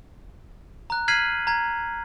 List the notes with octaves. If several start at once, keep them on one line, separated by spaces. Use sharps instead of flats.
A#5 F#6
F6 G#6 B6 C7 D#7 F#7
A#5 G#6